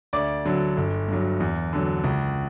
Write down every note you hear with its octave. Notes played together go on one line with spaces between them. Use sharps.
D2 D5 D6
D3 F#3
G1
G2 F#3
E2
D3 F#3
C#2